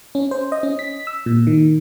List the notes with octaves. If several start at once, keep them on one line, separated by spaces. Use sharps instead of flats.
C#4
C5
D#5
C#4
B6
E6
A#2
D#3